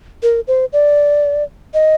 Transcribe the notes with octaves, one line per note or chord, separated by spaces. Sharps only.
A#4
C5
D5
D#5